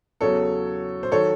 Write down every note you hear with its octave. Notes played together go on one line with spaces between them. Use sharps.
E2 C#3 F#3 A4 C#5
C5
D#3 F#3 A4 C#5